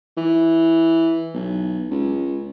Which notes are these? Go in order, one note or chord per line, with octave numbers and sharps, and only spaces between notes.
E3
B1
C#2